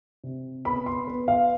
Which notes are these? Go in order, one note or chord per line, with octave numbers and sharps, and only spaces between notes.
C3
B3 B5
C6
B3
F5